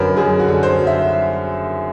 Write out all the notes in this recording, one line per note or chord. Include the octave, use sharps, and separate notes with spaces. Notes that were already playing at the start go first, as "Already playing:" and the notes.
Already playing: F#2 D3 F#3 A#4 B4
F#2 G#4
F#4
D3
C5
F#3
E5